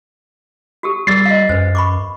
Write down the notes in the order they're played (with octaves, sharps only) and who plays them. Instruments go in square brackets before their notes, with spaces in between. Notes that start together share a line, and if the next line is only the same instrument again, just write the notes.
[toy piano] F#4 G4 A4
[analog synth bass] G3 [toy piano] F#4 G#4 A#4 [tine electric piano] A6 C7
[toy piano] D#5 F5
[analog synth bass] F#2 [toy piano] B4 C5
[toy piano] B5 C#6 D6